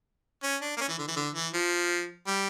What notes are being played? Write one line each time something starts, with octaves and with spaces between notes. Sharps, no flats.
C#4
D4
A#3
C#4
E3
D3
E3
D3
E3
F3
G3